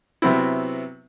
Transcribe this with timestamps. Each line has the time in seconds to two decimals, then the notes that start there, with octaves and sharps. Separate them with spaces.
0.22 C3 F#3 B3 C4 E4